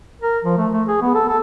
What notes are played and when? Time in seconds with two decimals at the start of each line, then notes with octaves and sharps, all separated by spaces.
0.22 A#4
0.45 F3
0.58 A3
0.73 A3
0.88 G#4
1.02 B3
1.15 A4
1.29 A4